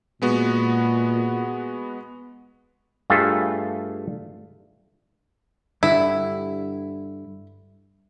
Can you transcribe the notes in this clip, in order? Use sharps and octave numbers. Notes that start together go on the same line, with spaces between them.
A#2 G#3 B3 F#4
G2 A3 F4 G#4 A4 E5
G2 D3 G3 E4